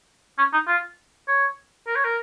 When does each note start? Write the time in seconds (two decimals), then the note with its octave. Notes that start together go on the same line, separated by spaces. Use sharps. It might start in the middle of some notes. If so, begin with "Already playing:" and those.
0.38 C#4
0.53 D#4
0.68 F4
1.28 C#5
1.87 A#4
1.96 C#5
2.04 A#4